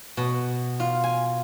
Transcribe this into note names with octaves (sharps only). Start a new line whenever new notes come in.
B2
F4
G#5